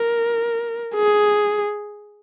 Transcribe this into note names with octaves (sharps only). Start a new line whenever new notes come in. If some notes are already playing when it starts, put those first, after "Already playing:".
Already playing: A#4
G#4